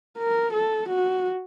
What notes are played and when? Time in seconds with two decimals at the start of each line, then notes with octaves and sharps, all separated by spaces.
0.19 A#4
0.53 A4
0.89 F#4